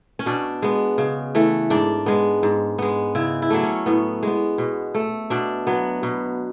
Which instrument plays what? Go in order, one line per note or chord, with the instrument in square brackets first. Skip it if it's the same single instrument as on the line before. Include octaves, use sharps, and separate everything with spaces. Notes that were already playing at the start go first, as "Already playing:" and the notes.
[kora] C#4
B2 D4
G#3 B3
C#3
E3 A3
G#2 D4
G#3 B3
G#2
G#3 B3
C#3 E4
E4
F#3 A3 D4
C#4
A2 B3
G#3 B3
B2
A3
B2 D4
F#3 B3
B2